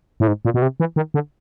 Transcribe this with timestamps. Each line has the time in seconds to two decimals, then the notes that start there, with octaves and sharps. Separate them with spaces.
0.20 A2
0.27 G#2
0.45 A#2
0.54 B2
0.62 C3
0.80 E3
0.96 D#3
1.14 D3